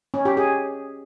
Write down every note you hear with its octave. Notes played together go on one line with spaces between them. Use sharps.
C#4
G4
G#4